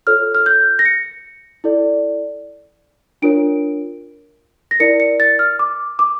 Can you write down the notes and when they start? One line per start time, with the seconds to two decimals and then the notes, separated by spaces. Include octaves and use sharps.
0.07 F4 A4 C#5 F6
0.35 F6
0.46 G6
0.79 A#6
0.85 C#7
1.64 E4 A4 D5
3.22 D4 F4 A#4 C#5 D7
4.71 A#6
4.80 E4 A#4 D5 C#7
5.00 C#7
5.20 A6
5.39 F6
5.59 D6
5.99 D6